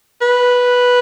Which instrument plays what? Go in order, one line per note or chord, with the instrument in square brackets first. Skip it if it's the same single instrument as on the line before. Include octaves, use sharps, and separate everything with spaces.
[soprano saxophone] B4